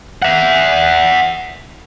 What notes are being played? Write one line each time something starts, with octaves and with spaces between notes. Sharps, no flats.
E5 F#5